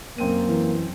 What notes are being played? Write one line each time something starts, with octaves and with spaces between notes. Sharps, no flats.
F#2 A#3 C4 D#7
E3